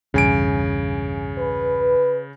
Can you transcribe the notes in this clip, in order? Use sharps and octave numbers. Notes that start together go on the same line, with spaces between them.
B1 E2 G2 C#3 G#5 D7
B4